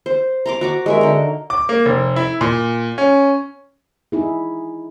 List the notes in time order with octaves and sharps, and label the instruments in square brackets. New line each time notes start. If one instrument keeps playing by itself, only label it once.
[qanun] C5
A#5 C6 D6
F#4 A#5 D6
G#3 A#4 E5
D3 D#4
[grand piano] D6
A#3
F1
E4
A#2
C#4
[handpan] D#4 E4 G#4